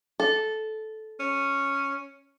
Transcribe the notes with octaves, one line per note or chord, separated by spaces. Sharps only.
A4
C#4